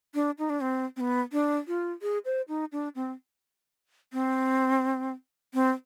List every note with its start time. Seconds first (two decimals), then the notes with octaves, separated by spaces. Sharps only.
0.14 D4
0.38 D#4
0.50 D4
0.61 C4
0.97 C4
1.00 B3
1.32 D4
1.68 F4
2.02 G#4
2.25 C5
2.49 D#4
2.72 D4
2.95 C4
4.13 C4
5.54 C4